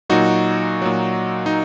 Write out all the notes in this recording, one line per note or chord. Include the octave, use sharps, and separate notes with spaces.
A#2 F#3 D#4 F#4
A#2 F#3
D#4